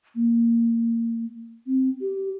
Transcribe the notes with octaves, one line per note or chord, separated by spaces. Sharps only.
A#3
C4
G4